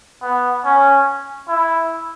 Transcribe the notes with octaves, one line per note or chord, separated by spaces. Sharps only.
B3
C#4
E4